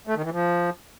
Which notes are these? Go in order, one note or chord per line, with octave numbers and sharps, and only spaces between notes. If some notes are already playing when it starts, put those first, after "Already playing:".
A3
D#3
E3
F3